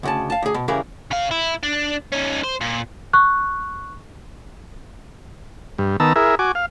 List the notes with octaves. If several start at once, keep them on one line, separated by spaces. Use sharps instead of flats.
D2 C#3 A5
F5 A5
D2 G#4
B2
C#3 E3 G3 E4 G#4 A#4
C#3 F5
E4
D4
C#4 D#4
C5
A#2
C#6 F#6
G2
D#3 B3 A5 A#5 E6
E4 G#4 A#4 E5
F#4 G#5 D6
F5